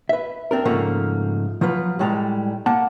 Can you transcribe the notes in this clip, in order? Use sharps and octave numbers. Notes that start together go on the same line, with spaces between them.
B4 E5
C4 D4 A#4
G#2 C#3 F3 A3 A#3
F3 F#3 F4 B4
A2 G3 G#3 D5 A#5
A#3 F#5 A5